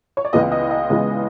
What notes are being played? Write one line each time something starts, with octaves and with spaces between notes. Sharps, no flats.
C#5
D5
C#2 C#3 E3 G#3 B3 D#5
D#5
D#5
C#2 C#3 E3 G#3 B3